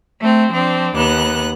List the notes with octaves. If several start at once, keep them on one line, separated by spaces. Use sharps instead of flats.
A3 C4
F3 C4 D4
D#2 B3 F#6